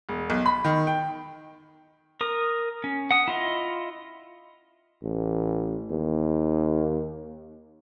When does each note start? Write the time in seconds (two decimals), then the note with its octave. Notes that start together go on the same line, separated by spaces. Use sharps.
0.09 E1
0.30 B1
0.46 B5
0.64 D#3
0.87 G5
2.21 A#4 D#6
2.84 C#4
3.11 F#5 D#6
3.28 E4 F4 D#5
5.03 A1
5.91 D#2